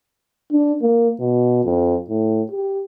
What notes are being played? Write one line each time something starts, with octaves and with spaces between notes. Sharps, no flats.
D4
A#3
B2
F2
A2
G4